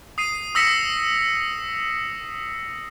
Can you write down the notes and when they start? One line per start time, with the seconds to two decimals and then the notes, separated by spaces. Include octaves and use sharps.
0.18 D#6 C7 D#7
0.55 D#6 E6 A#6 B6 C#7 E7